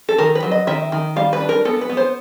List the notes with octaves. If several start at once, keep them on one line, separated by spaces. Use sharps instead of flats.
A4
D#3 A#4
B4
F#3
D#5
D#3 E5
D#3
G3 F5
B4
D4
A#4
B3 A4
B4
B3
C5